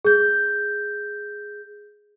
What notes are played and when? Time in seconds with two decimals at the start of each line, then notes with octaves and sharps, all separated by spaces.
0.05 G#4 G6